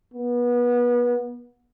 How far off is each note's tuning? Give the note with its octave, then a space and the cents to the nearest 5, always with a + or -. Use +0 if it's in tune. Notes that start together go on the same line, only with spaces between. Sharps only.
B3 -30